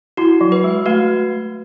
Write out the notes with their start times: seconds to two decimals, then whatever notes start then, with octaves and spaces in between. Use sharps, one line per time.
0.17 E4 F#4
0.41 F#3
0.52 B4
0.64 G#3
0.86 A3 F#4